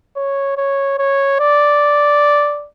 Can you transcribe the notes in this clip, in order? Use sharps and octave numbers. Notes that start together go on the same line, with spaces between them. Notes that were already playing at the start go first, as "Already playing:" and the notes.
C#5
C#5
C#5
D5